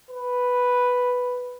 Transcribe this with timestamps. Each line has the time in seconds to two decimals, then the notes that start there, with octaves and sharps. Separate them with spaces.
0.10 B4